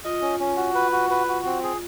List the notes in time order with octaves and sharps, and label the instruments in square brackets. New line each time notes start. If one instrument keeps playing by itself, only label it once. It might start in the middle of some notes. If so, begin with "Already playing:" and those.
[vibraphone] F4 [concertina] D#5
[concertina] C#4
C#4
F#4
B4
F#4
B4
F#4
C4
G#4